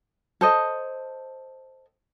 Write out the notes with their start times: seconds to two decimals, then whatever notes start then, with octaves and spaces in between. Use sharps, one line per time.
0.41 A4 C5 D#5